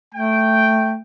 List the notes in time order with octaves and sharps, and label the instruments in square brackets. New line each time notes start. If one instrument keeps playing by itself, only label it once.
[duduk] A3 [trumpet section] G5